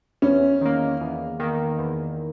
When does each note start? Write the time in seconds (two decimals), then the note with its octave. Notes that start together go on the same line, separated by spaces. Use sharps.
0.22 E2 C#4
0.61 D#3 A#3
1.01 E2
1.40 D#3 A#3
1.79 E2